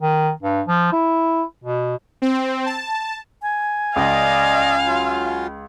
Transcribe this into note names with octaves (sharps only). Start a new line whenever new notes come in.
D#3
G2
F3
E4
B2
C4
A5
G#5
C#2 D5 D#5 F5
F#3 F4